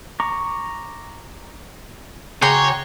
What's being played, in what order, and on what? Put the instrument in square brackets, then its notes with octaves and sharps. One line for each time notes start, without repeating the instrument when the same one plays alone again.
[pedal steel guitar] A#5 C#6 D6
[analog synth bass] C#3 [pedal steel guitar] F#4 C6 D6 [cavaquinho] G#4 G5 A#5 [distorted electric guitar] C#5